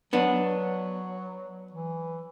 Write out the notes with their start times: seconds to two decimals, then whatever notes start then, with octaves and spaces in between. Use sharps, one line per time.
0.13 F#3 B3 D4
1.72 E3